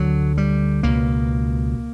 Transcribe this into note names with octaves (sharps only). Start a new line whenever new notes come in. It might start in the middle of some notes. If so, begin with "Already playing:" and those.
Already playing: D2 D3 F#3
G3
C#2 B2 A#3